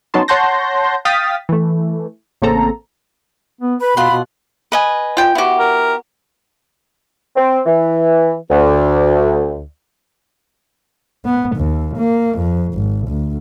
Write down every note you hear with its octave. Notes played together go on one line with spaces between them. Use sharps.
F#3 B3 C#4 D#4 A5 C6
C#5 F#5 A5 C6 G6 A#6
F5 G5 D#6 F6 A6 B6
E3 A3
A1 C#3 A#3 C4 A4 A#5
B3
B4 B5
B2 F4 F#5 C6
B2
B4 D#5 G#5
F4 G5
B3 E4 F#4 G4
A#4
C4
E3
D2
B3
D#2
A#3
F2
G#1
D2